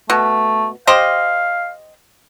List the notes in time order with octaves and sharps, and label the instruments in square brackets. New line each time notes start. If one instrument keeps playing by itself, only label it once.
[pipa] B2 [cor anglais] A3
[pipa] G4 C5 D#5 [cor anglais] F5